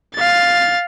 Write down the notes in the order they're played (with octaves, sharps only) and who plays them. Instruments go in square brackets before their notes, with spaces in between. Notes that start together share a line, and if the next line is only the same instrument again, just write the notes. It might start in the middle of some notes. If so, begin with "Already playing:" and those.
[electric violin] F5 A6